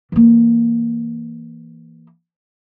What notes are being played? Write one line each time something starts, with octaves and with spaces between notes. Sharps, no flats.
E3 A#3